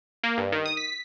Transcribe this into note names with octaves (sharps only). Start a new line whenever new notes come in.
A#3
G2
D#3
D#6
B6